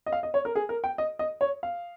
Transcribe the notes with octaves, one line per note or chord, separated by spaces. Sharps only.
D#5
F5
D#5
C#5
A#4
G#4
A#4
G5
D#5
D#5
C#5
F5